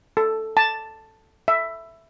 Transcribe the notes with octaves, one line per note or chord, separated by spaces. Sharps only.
A4
A5
E5